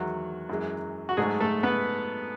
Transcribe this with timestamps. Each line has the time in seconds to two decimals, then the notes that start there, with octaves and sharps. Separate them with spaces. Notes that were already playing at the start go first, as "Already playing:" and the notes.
Already playing: E2 D#3 F#3 G#3 F#4
0.49 F#2 E3 G#3
1.09 F#4
1.17 G#2 F#3 G#3 A3 G#4
1.40 A3 A4
1.63 B3 B4